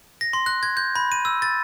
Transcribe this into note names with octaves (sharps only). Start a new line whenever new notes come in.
A#6
C6
F#6
G#6
G6
B5
D#7
E6
A6